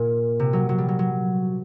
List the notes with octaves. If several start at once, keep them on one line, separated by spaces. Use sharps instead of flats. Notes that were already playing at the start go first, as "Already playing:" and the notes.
Already playing: A#2
C3
F#3
F#3
G3
F#3
F#3